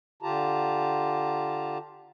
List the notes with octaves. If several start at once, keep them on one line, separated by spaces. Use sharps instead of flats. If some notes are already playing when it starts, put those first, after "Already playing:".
D3 F4 G4 A5 A#5